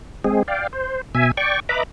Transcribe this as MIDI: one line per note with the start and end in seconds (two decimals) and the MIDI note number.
0.24 0.43 56
0.24 0.43 60
0.24 0.43 68
0.48 0.67 74
0.48 0.67 77
0.48 0.67 79
0.73 1.01 72
1.15 1.31 47
1.15 1.31 76
1.15 1.31 80
1.37 1.60 74
1.37 1.60 79
1.37 1.60 85
1.69 1.83 71
1.69 1.83 75
1.69 1.83 76
1.69 1.83 82
1.69 1.83 83
1.69 1.83 86